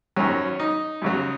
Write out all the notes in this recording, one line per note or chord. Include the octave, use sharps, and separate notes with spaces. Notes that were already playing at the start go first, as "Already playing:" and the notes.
G#1 F#2 D#3 F#3 C#4
D#4
F#2 C#3 F#3